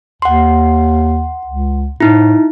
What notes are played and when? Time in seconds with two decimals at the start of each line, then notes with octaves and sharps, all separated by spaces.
0.22 D#2 F#5 C6
1.47 C#2
2.00 A2 D#4 E4